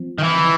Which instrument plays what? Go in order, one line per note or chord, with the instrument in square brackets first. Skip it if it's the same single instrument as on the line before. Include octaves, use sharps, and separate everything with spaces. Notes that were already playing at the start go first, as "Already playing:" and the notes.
Already playing: [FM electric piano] F3 C4
[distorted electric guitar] D#3
E3